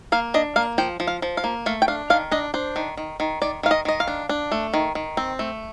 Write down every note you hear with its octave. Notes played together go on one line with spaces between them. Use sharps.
A#3 F5
D4 D#5
A#3 F5
F3 G5
F3
F5
F3
F5
A#3
A3 F5
G5
D4 F5
D#3 F5
D4 D#5
D4 C5
D#3
D#3
D#3
D#3 D5
D#3 F5
D#5
D#3 D#5
F5
D4
D4
A3
D#3
D#3
C4
A3